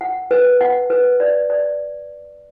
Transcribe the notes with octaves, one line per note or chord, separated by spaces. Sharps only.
F#5
B4
F#5
B4
D5
D5